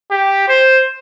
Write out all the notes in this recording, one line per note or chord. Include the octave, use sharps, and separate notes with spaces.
G4
C5